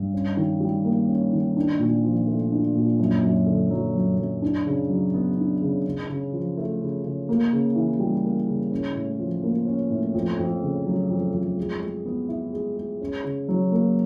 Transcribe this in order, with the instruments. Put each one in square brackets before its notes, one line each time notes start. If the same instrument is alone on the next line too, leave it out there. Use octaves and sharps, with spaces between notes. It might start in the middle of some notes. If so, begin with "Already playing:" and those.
Already playing: [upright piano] G2
C#4
D#3
G3
A#3
C#4
D#3
D4
A#2
F3
A3
D4
A#2
F#2
F#2
D3
F#3
F#2
F#2
D4
C#3
F#3
B3
D4
C#3
C#3
C#3
F3
A3
C#3
C#3
A#3
C#3
E3
G3
A#3
C#3
C#4
A2
F3
A#3
C#4
A2
F2
F2
C#3
F#3
F2
F2
G#3
G#3
B3
E4
G#3
G#3
C#4
C#3
F#3
A#3